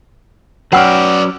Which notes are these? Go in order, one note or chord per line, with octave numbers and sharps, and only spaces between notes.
F#3 C#4 B4 D5 F#5 G5 E6 F6